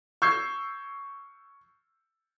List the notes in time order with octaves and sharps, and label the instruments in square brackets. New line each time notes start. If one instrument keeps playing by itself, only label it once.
[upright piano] C#6 E6 G6 G#6 C7